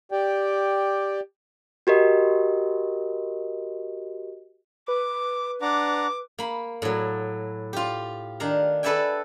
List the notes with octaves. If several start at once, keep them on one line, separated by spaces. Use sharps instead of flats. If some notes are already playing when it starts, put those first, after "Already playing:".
G4 D5 G5
F#4 G4 A#4 D#5
B4 D6
D4 F#5 A#5 D6
A#3 B5
A2 F#3
F4 G4
D#3 D4 F5 A#5
A4 B4 D5 E5 G5 G#5